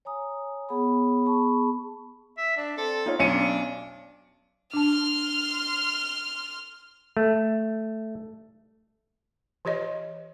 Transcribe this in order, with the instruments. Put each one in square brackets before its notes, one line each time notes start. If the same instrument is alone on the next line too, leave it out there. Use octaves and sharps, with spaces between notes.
[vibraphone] C#5 G#5 A#5 D#6
B3 G#4 C#5 F#5 B5 D#6
B3 G#4 A5 B5 C#6
[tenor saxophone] E5
D4
[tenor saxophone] C4 [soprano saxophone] A4
[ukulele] D#4 F4 C#5
[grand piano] B1 C#7 D#7 [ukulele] C#4 C#5 [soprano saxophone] D4
[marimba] D4 A5 [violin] C6 F6
[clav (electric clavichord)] A3
[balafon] E3 G4 C#5 D#5